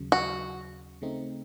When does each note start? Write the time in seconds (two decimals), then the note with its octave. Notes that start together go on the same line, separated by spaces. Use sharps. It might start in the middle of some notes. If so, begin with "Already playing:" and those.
Already playing: D#2 C#3 F#3
0.12 F#4
1.02 C#3 A3 C4 D#4